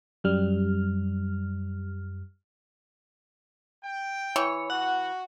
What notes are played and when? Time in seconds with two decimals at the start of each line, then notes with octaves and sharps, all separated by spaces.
0.24 F#2 G3 F6
3.83 G5
4.36 E3 C#5
4.70 F#4 F#5